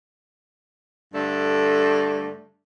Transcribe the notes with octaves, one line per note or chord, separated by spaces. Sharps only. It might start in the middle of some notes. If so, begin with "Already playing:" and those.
G2 D3 A3